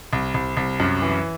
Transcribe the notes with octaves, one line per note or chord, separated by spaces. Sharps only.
C2
C2
C2
F#2
E3